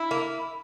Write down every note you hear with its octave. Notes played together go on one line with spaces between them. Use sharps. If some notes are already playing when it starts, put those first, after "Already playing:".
Already playing: E4
A#3